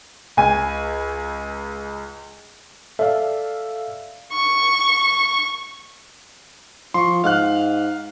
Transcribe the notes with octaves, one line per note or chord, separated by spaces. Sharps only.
C#2 G#5
A4 D5 E5 F5
C#6
F3 C6 C#6
G#2 F5 F6 F#6